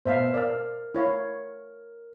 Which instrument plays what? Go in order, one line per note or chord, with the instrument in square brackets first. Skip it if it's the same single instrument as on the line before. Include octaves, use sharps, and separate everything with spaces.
[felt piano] B2 [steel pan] C5 E5 F5
[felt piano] A#4 F6 [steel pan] D5 F5
[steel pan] E4 C#5 F5